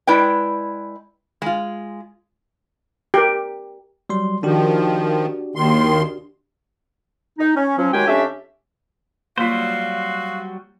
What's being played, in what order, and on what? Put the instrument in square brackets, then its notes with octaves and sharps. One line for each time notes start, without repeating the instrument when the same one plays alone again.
[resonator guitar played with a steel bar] G#3 E4 B4 D5 G5
G#3 F4
[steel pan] G4 A#4
[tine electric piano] F#3 G3 C6
[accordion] D#3 F3 [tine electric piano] D4 F#4 G4
[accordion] D#2 D#3 C6
[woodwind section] D#4
C#4
F3 F#3 C#4
D#2 F#3 G#3 G4 G5 G#5
F2 C#4 D4 G4 E5
[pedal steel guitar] F#3 G3 C5 [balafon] A#3 F4 [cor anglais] F#4 [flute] F5